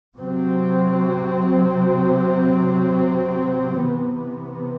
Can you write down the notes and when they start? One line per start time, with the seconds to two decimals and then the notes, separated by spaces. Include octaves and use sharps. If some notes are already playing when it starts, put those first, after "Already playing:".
0.17 C3 F#3 C4
3.84 C3 E3 B3